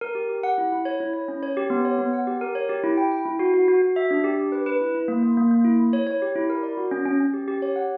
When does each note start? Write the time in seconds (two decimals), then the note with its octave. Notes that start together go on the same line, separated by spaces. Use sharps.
0.01 A#4
0.15 G4
0.29 G4
0.43 F#5
0.58 E4
0.72 E4
0.85 C#5
1.00 E4
1.14 C#5
1.28 C#4
1.43 C#5
1.57 G4
1.70 B3
1.85 C#5
1.98 B3
2.13 F#5
2.27 G4
2.41 A#4
2.55 C#5
2.69 G4
2.84 E4
2.97 G5
3.11 G5
3.25 E4
3.39 F#4
3.54 F#4
3.68 F#4
3.82 F#4
3.96 E5
4.11 D4
4.24 G4
4.39 D4
4.52 B4
4.66 B4
4.81 E4
4.95 E4
5.08 A#3
5.23 A#3
5.37 A#3
5.51 A#3
5.64 E4
5.80 E4
5.93 C#5
6.07 C#5
6.22 G4
6.36 E4
6.50 A#4
6.63 D5
6.77 F#4
6.91 C#4
7.05 C#4
7.20 C#4
7.34 G4
7.48 G4
7.62 C#5
7.76 F#5